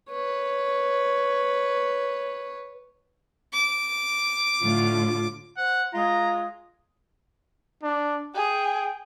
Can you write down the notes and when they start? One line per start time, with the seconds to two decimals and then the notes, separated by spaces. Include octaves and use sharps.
0.10 B4 C#5
3.53 D6
4.63 A2 D3 F4
5.58 C5 F#5
5.94 G#3 F4 A#5
7.83 D4
8.36 G#4 G5